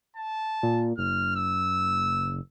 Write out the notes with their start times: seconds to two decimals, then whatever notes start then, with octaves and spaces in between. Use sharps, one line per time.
0.16 A5
0.63 A#2
0.98 F#1 F6
1.36 E6